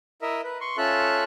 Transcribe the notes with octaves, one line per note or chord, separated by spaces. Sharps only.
E4 A#4 D#5 E5
B4
C6 C#6
C#4 F4 A4 E5 F#6